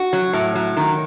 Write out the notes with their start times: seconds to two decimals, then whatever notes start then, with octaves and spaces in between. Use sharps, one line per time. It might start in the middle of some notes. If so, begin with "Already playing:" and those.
Already playing: F#4
0.13 F#3
0.33 A2
0.55 F#3
0.77 D#3